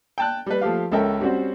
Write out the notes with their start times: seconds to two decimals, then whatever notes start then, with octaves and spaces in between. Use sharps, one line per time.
0.18 G5 A5 F#6
0.46 G3 B4
0.61 F3 A3 G4 F5
0.92 C#2 C#4 A4 A#4 E5 G5
1.21 G3 C4 C#4 F#4 C5